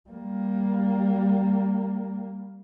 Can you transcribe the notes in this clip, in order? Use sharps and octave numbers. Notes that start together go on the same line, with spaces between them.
G3 A#3